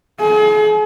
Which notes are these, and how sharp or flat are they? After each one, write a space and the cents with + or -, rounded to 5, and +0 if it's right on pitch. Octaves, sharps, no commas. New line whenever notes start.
G#4 +40